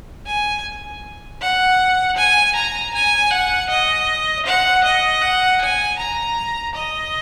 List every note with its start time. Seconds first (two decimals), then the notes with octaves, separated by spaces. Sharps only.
0.26 G#5
1.41 F#5
2.16 G#5
2.55 A#5
2.94 G#5
3.31 F#5
3.69 D#5
4.45 F#5
4.84 D#5
5.22 F#5
5.61 G#5
5.98 A#5
6.75 D#5